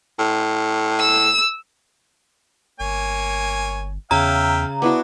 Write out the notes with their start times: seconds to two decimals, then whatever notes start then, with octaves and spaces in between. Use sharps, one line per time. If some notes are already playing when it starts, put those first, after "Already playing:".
0.19 A2
1.00 E6
2.80 G1 A#3 C#5 G#5
4.11 E2 C#3 E5 F5 G5 A#5
4.82 B3 D4 E4 F#4 D6